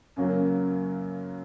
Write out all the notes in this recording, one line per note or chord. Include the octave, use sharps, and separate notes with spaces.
F#2 C#3 F#3 A#3